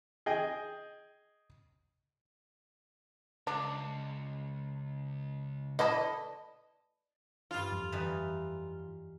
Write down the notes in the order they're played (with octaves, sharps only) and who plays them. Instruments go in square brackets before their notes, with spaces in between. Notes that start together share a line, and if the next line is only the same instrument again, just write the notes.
[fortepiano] G#4 D#5 G5
[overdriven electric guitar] C#2 [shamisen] D4
[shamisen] E3 E4 A4 [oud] D#5
[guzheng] G2 A4 [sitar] F4
[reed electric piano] F2
[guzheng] E3 G3 D#4